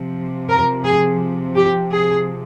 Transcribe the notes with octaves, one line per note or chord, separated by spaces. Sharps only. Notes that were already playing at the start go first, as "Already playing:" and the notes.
Already playing: C3 F3
A#4
G#4
G4
G#4